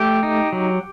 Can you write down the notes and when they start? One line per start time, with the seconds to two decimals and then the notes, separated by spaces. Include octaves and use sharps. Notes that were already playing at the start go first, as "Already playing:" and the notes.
Already playing: A3 G4
0.23 D#4
0.52 F#3